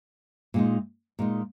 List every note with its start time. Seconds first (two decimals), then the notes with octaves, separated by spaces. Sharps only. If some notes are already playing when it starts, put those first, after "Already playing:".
0.54 A#2 G#3 D#4
1.19 A#2 G#3 D#4